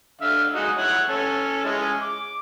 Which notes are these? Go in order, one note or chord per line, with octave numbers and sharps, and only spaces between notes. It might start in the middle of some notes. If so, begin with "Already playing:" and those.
D3 E5 F5
G#3 D#4 F#4
E4 C#5 F#5
C#4 A4
G#3 C#4 E4
D6